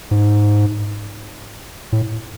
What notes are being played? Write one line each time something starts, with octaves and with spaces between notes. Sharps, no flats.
G#2
A2